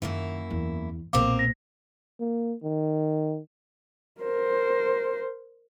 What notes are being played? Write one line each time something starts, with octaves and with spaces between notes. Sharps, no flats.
F#2 D#3 A#3 E4
E2
B1 A#2 A#3 C4 A#4 F5 D6
A#6
A#3
D#3
A#4 C5